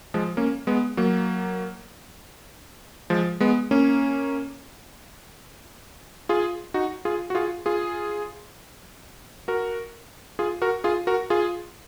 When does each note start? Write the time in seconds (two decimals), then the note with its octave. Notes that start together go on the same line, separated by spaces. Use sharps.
0.14 F3 G#3
0.37 A#3 C#4
0.67 G#3 B3
0.97 F#3 A#3
3.10 F3 G#3
3.40 G#3 B3
3.71 A#3 C#4
6.29 F4 G#4
6.74 D#4 F#4
7.05 F4 G#4
7.30 F#4
7.35 F4 G#4
7.66 F4 G#4
9.48 F#4 A#4
10.39 F4 G#4
10.62 F#4 A#4
10.84 F4 G#4
11.07 F#4 A#4
11.30 F4 G#4